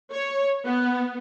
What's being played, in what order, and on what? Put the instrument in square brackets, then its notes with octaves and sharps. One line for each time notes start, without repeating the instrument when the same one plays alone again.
[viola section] C#5
B3